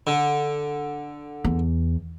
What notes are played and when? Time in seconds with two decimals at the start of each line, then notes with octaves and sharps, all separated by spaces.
0.07 D3
1.44 E2